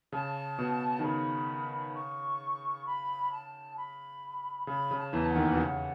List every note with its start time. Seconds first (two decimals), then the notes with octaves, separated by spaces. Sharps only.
0.12 C#3 A5
0.58 B2
0.99 D#3
1.03 C#3 B5
1.94 C#6
2.86 B5
3.32 A5
3.77 B5
4.67 C#3 B5
4.91 C#3
4.98 A5
5.13 E2 E3
5.29 F#5
5.35 D#2 D#3
5.53 B2
5.58 C#3 F#5